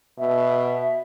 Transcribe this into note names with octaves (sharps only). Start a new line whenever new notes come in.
B2 E5